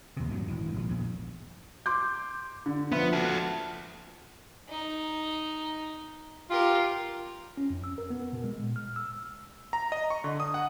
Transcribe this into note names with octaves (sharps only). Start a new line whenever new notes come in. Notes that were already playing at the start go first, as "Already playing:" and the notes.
D#2 C3
G2 A#2 D#3 F#3
G#1 C#2 E3
A#1 F3
A#1 E2 G#2
C6 D6 G6
D3
F3 B3 F4 E5
F#4 A4
D#4
F4 G4 A#4
C#4
F2
E6
A#4
B3
B2
G#3
A#2
F6
E6
A#5
D#5
C#6
D3
D#6
F#5